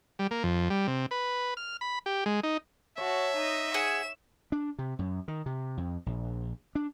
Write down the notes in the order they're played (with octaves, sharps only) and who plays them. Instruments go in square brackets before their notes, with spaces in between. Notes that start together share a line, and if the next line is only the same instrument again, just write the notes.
[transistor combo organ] G3
A#3
F2
G3
C3
B4
F6
B5
G4
G#3
D#4
[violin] F#4 A5 [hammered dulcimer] C#5 [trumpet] E5
[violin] D#4 D#5
[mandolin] G#4 F#5 [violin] E7
[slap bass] D4
C3
F#2
D#3
C3
F2
A#1
D4